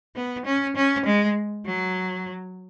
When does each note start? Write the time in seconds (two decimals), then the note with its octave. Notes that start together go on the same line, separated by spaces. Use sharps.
0.15 B3
0.45 C#4
0.76 C#4
1.05 G#3
1.65 F#3